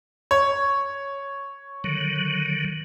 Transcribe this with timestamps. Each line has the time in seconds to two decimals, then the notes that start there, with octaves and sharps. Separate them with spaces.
0.31 C#5
1.84 D3 D#3 F#3